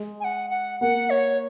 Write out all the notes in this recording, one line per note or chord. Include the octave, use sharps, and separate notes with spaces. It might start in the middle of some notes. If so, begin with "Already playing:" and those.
Already playing: G#3
G#5
F#5
F#5
A#3 F#5
C#5